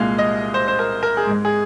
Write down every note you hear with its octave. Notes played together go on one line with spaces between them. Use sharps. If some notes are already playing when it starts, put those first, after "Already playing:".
Already playing: C2 A#2 G#3 F5
D#5
C5
C5
A#4
A#4
G#4
G#2 G#3
G#4